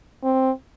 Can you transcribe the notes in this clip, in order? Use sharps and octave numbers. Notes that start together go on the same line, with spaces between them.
C4